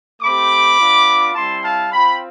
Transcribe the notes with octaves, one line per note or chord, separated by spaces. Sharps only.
A3 C4 G4 B5 D6
B3 D4 F4
G3 C4 E4 A5 C6
F5 A5
C4 F4 G5 B5